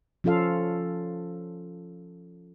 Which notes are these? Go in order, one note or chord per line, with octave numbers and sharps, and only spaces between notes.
F3 C#4 F4 A4 F5